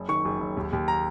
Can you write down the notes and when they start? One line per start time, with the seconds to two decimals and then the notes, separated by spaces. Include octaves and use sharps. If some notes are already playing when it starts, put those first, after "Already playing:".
Already playing: F#1
0.09 D#3 C#6
0.25 F#1
0.40 F#1
0.57 D#2
0.73 D#2
0.88 A#5